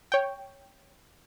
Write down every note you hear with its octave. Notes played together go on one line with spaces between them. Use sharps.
C#5 G5